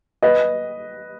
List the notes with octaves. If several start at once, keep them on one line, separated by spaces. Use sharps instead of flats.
B4 D#5